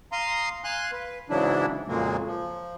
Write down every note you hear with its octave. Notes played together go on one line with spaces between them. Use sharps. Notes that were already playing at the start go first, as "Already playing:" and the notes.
F5 A#5 C6 D#6
F5 G#5 C6 F#6
B4
G#2 C#3 E3 F#3 D4 E4
F2 A#2 C#3 F#3 G#3 A#3
F3